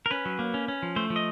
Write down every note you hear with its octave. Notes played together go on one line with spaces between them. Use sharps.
A#4
C#4 B4
F#3
A#3
C#4
C#4
F3
A3 C5
F3
D#5